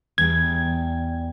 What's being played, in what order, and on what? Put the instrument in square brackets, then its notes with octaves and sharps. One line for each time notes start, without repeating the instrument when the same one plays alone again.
[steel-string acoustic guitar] E2 G3 G5 [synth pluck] G#6